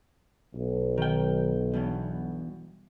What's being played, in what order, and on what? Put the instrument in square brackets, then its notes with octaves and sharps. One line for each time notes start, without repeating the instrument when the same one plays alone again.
[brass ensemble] B1
[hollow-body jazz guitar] D#3 G5
E2 G2 B2